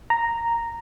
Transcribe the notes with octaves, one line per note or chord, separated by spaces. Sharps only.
A#5